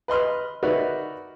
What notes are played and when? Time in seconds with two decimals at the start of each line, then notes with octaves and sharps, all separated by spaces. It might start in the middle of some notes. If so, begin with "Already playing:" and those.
0.08 B4 D#5 C6 F6
0.63 D#4 F#4 A#4 B4 D5 E5